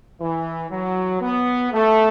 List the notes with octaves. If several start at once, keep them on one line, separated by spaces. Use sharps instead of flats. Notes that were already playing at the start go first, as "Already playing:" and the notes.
E3
F#3
B3
A3